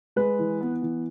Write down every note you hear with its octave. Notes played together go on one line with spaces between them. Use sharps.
G#3 B4
E3
B3
E3